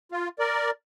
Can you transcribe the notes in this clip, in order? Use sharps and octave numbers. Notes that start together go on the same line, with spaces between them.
F4
A#4 D5